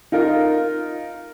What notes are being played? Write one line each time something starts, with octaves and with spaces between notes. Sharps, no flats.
D#4 F4 A#4